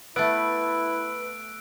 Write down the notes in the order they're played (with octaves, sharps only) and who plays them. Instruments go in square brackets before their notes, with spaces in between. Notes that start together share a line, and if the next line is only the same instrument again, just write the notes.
[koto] A3 B3 [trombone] E4 [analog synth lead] B4 [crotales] E6 F#6 D7